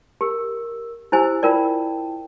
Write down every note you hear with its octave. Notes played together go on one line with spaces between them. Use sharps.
G4 A#4 E6
E4 G4 C5 G#5 E6
E4 F4 A#4 D5 G5 A5